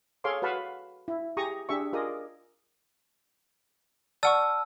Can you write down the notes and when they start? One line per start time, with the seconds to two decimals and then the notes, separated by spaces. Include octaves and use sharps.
0.24 G#4 A4 C#5 F5 C6 D6
0.42 F#4 B4 F5 A5 B5 C#6
1.08 E4
1.37 G4 G#4 A#5 C#6 D#6
1.69 D4 G4 G#4 E5 C#6
1.93 F4 G#4 A#4 D5 D#5 D#6
4.23 D5 F#5 A5 C#6 E6 F6